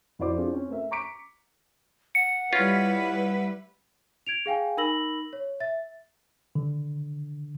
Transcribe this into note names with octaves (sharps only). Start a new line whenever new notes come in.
F2 E4 F#4 C5 D5 D6
C4 D4 E4 F4 G#4
C4 C#4
A3 A#4 E5
A#5 C#6 D6 B6 C#7 D7
F#5 C#7
G3 C#4 E4 F4 B4
G#6 D7 F7
G#4 F5 G5 G#5
D#4 A#4 B5 E6 A#6 F#7
C#5
E5 A6
D3